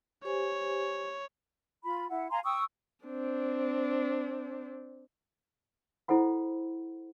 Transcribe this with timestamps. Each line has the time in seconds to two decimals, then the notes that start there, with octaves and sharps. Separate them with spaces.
0.25 G4 C5 C#5 G#5
1.84 F4 B5
2.09 E4 F#5
2.31 F5 G#5 A#5 C6
2.44 G5 C#6 D#6 E6
3.05 C4 D4
6.08 E4 A4 C5 F#5 B5